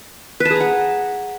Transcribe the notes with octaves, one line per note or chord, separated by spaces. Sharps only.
B4
A5
G#4
A#5
F#5